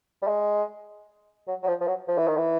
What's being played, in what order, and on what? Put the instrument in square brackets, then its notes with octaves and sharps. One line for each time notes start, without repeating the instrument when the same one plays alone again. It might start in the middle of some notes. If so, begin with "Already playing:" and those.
[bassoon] G3
G#3
F#3
F#3
F3
F3
F#3
F3
E3
D#3
E3